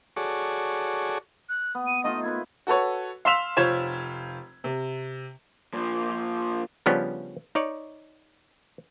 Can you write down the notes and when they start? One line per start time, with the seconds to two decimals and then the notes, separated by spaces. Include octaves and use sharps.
0.16 F#4 G#4 A4 C#5 D5
1.49 F#6
1.75 B3
1.87 D#7
2.04 A3 D#4 F4 D#5
2.23 A#3 E4 B4 G#6
2.67 F#4 A4 B4 C#5
3.25 F5 C6 E6 B6 E7 F7
3.57 F1 F4 C5 C#5 G#6 E7
4.64 C3
5.74 A#2 F3
6.86 C#3 F3 G3 B3 C#4 D4
7.55 D#4 C#5 D5